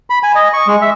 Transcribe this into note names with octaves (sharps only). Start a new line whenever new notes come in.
B5
G#5
D#5
C#6
G#3
E5